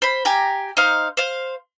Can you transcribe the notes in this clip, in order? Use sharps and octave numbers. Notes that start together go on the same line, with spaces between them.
C5 B5
G4 G#5 A#5
D#4 C5 F5
C5 F5